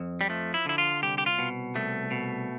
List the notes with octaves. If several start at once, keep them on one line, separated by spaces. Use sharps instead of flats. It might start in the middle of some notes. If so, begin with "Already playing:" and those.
Already playing: F2
G3
F3 A3
E4
D3 E4
F4
C2 G4
G4
F4
B2
C2 A3
B2